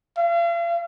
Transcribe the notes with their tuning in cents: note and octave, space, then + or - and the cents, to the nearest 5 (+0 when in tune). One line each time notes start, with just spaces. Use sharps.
F5 -40